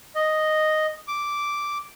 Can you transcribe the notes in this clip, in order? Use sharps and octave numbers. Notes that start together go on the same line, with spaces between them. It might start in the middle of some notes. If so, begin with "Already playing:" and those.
D#5
D6